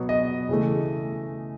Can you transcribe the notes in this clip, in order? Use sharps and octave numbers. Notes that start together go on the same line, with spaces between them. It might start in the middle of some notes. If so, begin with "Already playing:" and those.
Already playing: B2 F#3 B3
D#5
C#3 E3 A3